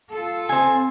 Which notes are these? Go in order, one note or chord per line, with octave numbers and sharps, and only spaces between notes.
F4 A4
C4 G#5